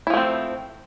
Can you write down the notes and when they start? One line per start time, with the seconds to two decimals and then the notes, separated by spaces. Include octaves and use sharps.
0.07 E4
0.10 F3
0.14 A3
0.17 C4